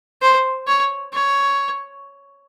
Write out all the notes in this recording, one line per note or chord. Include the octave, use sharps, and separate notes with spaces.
C5
C#5
C#5